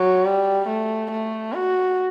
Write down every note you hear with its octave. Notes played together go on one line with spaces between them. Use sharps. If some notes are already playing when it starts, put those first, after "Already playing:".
Already playing: F#3
G3
A3
A3
F#4